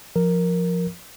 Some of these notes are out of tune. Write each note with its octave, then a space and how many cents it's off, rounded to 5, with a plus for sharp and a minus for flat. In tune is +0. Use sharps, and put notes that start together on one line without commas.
F3 +0 A#4 +0